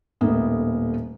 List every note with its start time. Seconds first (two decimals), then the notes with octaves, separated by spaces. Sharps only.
0.21 D#1 A2 A#3 B3 D#4